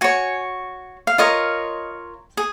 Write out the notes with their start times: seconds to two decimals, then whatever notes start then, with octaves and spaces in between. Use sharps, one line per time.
0.01 F#4 C#5 G#5
1.07 F5
1.18 F4 A#4 C#5 D#5
2.37 G#4